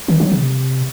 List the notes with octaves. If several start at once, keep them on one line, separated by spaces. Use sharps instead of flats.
D#3
F#3
C3